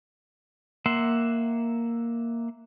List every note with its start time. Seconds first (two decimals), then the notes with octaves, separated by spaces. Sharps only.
0.86 A#3 E5 F#5 C6